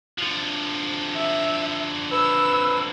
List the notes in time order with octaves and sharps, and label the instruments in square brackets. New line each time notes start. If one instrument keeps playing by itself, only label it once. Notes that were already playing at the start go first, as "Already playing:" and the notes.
[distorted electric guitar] D3 F3
[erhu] E5
[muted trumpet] B4 [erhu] E6